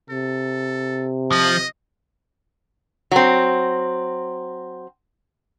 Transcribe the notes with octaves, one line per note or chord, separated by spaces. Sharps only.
C3 A4
F3 D#5
F#3 C4